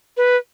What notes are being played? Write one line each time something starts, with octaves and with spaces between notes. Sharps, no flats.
B4